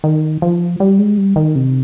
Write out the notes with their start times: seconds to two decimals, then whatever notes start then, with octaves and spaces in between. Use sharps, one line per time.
0.04 D#3
0.42 F3
0.80 G3
0.99 G#3
1.17 G3
1.36 D#3
1.55 C3